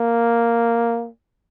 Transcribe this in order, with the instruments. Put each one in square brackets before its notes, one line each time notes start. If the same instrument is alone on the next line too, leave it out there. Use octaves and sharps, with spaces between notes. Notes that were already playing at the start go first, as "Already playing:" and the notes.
Already playing: [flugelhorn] A#3